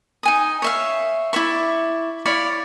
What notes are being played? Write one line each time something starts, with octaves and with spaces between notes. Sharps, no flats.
D#4 G#5 D#6
C#5 E5 F5
E4 D5 E5 C#6
E4 C#5 D5 F5